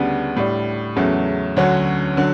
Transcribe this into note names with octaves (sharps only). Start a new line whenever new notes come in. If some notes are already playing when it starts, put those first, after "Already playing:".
Already playing: D2 C#3 G3 B3 D4
A2 G3 D4
E2 C#3 F#3 A3
D2 D3 F#3 C#4
D3 F#3